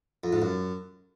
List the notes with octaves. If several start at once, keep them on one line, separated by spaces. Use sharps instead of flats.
F2
G#2
F#2